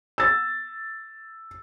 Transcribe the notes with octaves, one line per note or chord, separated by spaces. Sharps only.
E6 A6